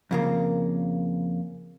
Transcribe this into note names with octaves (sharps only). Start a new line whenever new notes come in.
F2 C#3 A#3